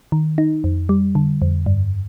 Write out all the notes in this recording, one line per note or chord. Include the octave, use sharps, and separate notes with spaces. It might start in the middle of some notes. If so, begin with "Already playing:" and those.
D#3
D#4
F2
G3
D3
F2
G2